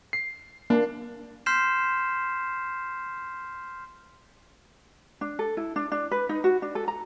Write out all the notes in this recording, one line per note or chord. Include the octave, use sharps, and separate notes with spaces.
C7
A#3 D4
C6 F6 G6 B6 C7 E7
D4
A4
E4
D4
D4
B4
D#4
F#4
D4
A4
A#5